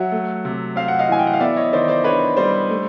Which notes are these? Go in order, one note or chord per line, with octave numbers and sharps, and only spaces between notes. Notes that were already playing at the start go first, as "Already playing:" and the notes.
Already playing: F#3 E5 F#5
A3
C3
C4 F5
F#5
D#5 F5
E3 G#5
G5
F#5
F5
B3 D5 E5
C#5 D#5
D#3 C5 D5
C5 D5
D4 B4 C#5
G3 C5 D5
A3